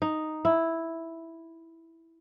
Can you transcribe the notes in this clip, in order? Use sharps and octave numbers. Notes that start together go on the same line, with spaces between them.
D#4
E4